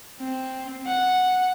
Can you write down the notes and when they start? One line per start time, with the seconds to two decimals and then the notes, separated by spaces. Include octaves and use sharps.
0.20 C4
0.86 F#5